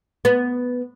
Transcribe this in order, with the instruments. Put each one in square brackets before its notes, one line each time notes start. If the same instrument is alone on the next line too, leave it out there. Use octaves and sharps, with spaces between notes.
[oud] B3